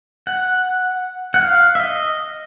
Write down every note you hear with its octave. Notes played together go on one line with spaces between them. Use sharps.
F#5
F#5
F5
E5
D#5